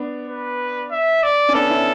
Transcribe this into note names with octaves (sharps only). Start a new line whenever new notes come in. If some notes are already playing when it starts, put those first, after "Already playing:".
Already playing: B3 D4
B4
E5
D5
C#4
B3 D4 A4
C#4 E4